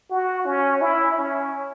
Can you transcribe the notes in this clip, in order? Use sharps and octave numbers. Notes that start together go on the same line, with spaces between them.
F#4
C#4
E4
C#4